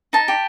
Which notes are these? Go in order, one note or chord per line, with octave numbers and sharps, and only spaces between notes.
D#4 A5
G4